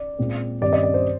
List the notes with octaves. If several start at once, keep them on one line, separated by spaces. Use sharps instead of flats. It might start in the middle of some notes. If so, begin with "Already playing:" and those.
Already playing: D5
A#2 G#3 C4
G2 D#3 G3 C4 D5
D#5
D5
C5